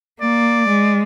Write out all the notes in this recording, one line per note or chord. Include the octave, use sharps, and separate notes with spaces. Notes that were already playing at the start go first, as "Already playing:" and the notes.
A#3 D5
G#3